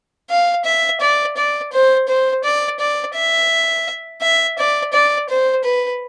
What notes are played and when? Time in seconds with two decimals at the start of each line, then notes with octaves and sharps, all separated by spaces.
0.30 F5
0.65 E5
1.01 D5
1.37 D5
1.72 C5
2.08 C5
2.44 D5
2.80 D5
3.15 E5
4.22 E5
4.58 D5
4.93 D5
5.29 C5
5.64 B4